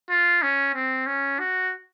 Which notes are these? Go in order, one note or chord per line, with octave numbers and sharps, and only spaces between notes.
F4
C#4
C4
C#4
F#4